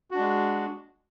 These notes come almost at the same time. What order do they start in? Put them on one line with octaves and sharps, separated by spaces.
F#4 D4 G#3